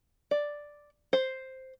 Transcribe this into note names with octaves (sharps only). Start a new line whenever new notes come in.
D5
C5